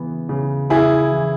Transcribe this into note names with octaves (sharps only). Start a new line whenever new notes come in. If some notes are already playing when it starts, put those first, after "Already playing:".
Already playing: C#3 E3 B3
C#3
C#3 E4 G#4
E3